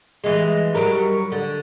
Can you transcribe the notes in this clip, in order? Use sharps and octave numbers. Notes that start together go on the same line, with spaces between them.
E3 G#3
F#3 G3 A#4
D3